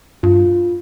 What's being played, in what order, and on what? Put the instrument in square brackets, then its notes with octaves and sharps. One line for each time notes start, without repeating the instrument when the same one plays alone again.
[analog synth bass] G2 [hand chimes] F4